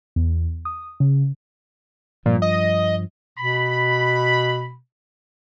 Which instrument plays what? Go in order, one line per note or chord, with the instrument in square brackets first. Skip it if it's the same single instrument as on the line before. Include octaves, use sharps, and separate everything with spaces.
[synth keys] E2
D#6
C#3
[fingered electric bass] G2 F3 [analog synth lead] A#2
[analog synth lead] D#5
[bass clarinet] B2 [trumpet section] B5